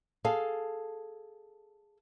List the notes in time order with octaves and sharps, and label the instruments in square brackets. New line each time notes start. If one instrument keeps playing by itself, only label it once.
[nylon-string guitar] G#4 A4 F5